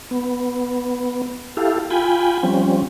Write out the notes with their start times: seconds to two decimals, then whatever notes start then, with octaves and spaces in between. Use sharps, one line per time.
0.11 B3
1.57 E4 G4 A4 F5
1.90 F4 G5 G#5 B5
2.43 F3 G3 C4 C#4